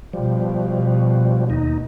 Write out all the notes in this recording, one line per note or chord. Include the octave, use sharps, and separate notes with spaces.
B2 F3 G3
D#2 D#4